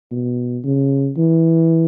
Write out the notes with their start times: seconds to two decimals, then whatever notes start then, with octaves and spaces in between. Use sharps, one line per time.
0.11 B2
0.64 C#3
1.17 E3